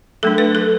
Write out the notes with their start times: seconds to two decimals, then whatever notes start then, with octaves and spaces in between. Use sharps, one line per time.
0.23 F#3 A3 D4 A4
0.38 B4
0.55 A4